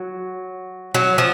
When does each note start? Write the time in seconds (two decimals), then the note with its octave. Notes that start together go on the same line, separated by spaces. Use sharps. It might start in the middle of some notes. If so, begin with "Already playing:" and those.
Already playing: F#3
0.95 F#3
1.18 F3